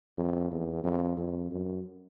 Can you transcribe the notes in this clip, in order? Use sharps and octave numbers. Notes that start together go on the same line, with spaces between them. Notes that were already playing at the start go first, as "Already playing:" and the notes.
F2
E2
F2
F2
F#2